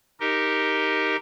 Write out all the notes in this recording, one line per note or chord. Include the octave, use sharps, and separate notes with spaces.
D#4 G4 A#4 D#5